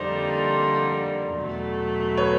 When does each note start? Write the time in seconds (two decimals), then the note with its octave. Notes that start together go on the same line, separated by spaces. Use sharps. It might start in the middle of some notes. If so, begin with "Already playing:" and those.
Already playing: F2 D3 G3 A#3 D#4 C5 D5
1.36 E2 B2 F#3 A3
2.17 B4 C#5